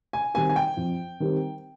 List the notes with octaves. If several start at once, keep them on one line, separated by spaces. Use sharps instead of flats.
G#5
D#3 G3 C4 G4 G#5
G#5
G5
F2
D#3 G3 C4 G4